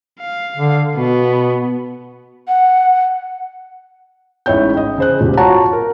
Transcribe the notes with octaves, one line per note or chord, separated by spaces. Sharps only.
F5
D3
B2 B3
F#5
A1 G#2 E4 C#5 G5 G6
D#5
C#3 C5 F#6
E1 G4
F4 F#4 C#5 F#5 A5 A#5
A#4